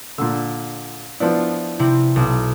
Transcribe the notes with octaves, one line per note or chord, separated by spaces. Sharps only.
A#2 D3 E6
F3 B3 D4 E4
C3 C4 E4
B1